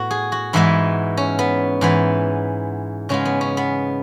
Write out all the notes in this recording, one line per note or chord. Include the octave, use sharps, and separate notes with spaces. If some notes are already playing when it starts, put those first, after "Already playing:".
Already playing: A2 B3 F#4
G#4
F#4
G#2 E3 G#3 B3 E4
C#4
B3
G#2 E3 B3
C#3 G#3 B3 C#4
B3
C#4
B3